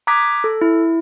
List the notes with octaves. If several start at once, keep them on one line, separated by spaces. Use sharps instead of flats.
A#5 D6 D#6 F#6 G#6 B6
A4
E4